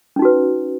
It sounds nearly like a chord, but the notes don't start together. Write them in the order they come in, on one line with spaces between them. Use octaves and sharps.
C#4 D#4 F#4 B4